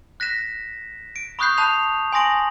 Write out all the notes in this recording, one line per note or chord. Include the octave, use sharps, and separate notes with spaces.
F#6 A#6 B6 E7
D7
B5 C#6 D#6 F#6 G6 C7
A5 B5 F#6 G6 C7 F7
G#5 C6 D#6 A#6 D7 F#7